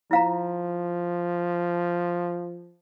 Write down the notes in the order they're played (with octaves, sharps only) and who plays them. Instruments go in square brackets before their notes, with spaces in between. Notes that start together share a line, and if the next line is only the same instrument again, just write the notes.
[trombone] F3 [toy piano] E4 F5 A#5